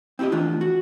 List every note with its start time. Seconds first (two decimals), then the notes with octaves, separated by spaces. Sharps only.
0.19 C4 E4 F#4 G4 D#5
0.32 E3 A3 D4 F4
0.61 F#4